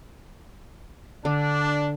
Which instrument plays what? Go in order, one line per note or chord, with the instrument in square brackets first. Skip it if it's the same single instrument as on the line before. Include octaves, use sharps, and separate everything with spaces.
[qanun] D3 [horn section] D4